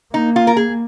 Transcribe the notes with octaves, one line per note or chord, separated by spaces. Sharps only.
A#3 D#4
F4
A#4
G#4